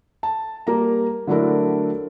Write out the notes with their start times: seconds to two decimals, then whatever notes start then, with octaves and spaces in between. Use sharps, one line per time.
0.23 A5
0.67 G3 A#3 A#5
1.27 D3 F#3 A3 D4 E4 A#4